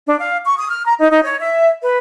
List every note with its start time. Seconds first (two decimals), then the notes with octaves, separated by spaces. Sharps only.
0.07 D4
0.20 F5
0.44 C#6
0.59 D#6
0.70 F6
0.86 A#5
0.99 D#4
1.11 D#4
1.24 C#5
1.40 E5
1.81 B4